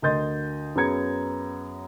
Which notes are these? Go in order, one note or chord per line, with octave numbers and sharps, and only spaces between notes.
D2 A#4 D#5 C6 G6 A6
F#2 B3 G#4 A#5 G#6 C#7